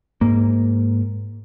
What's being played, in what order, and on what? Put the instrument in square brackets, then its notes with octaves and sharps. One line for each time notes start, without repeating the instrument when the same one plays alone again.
[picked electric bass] G#2 A#3